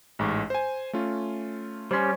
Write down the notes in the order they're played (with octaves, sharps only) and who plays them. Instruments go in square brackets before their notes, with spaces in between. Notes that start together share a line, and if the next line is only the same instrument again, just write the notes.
[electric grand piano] A1 G#2 C#6
C5 G#5
A3 C#4 F4
[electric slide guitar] G3 C#4 [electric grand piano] C5 C#5 C6